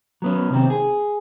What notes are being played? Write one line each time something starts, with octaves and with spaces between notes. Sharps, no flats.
F#3 B3 C#4
C3 D#3 C4
G#4